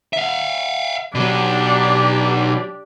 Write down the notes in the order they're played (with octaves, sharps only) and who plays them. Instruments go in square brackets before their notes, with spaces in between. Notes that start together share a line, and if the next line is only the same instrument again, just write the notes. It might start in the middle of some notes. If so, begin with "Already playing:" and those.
[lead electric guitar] E5 F5
[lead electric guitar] B2 F#3 [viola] D4 G4